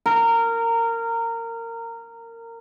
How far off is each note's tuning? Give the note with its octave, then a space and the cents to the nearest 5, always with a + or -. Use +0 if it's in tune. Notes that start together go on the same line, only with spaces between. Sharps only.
A#4 -20